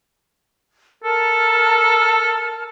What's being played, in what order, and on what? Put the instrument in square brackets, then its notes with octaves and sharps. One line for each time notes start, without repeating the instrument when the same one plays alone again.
[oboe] A4 [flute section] A#4 A5 F6